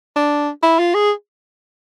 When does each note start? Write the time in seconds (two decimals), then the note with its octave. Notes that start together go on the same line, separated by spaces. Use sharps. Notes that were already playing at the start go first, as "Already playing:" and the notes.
0.16 D4
0.63 E4
0.79 F4
0.94 G#4